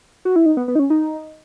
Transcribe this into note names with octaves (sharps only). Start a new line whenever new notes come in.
F#4
E4
D#4
B3
B3
D#4
C#4
D#4